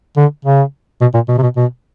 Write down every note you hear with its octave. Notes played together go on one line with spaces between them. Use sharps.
D3
C#3
B2
A#2
B2
C3
B2
B2